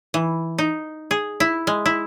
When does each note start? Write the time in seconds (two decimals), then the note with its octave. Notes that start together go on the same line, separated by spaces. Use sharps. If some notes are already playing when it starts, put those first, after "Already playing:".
0.14 E3
0.58 D#4
1.11 G#4
1.40 E4
1.67 G#3
1.86 E4